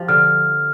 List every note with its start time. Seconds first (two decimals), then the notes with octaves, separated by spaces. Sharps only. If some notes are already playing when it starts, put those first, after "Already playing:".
Already playing: F3 G4
0.09 D3 F6